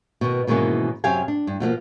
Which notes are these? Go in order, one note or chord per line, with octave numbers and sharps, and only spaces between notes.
B2 D#3
G#2 B2 D#3 E3 A#3 C#4
F#2 C3 G4 F5 G#5
D4
G2
B2 F3 A3 A#3